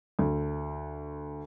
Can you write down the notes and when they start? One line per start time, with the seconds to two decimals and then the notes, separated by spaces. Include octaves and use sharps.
0.19 D2